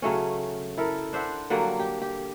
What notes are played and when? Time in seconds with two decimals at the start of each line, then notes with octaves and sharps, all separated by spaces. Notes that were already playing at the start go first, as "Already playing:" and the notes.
0.02 C#3 F#3 A3 C#4
0.78 E4 A4 A#4
1.13 D4 C5 E5 F#5
1.50 D3 F#3 G3 A#3
1.80 G4
2.02 G4